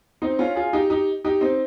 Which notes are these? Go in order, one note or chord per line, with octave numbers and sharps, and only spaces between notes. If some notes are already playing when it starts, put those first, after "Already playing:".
C4 D#4
C#4 F4
F4 G#4
D#4 G4
D#4 G4
D#4 G4
C4 D#4